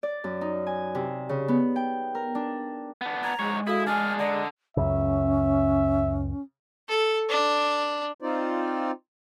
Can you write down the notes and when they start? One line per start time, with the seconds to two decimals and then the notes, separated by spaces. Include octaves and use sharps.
0.03 D5
0.24 F#2
0.41 D#4
0.67 G#5
0.95 C3
1.29 C#3
1.48 B3
1.76 G5
2.15 A#4
2.35 D4
3.01 B3 D4
3.24 A#5 G#6 A6
3.39 G#2 G#3 C#5
3.67 E4 F#4 A4 F5 D#6
3.87 D4 G#4 G#5 F6
4.19 D3 D5 D#5 A#5
4.77 C#2 F#2 C#3 C#4 E5
6.88 A4
7.29 D4
8.21 C4 D#4 F4 C5 D5